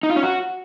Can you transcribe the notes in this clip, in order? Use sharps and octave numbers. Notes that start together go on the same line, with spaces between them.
D#4
F4
C#4
F#4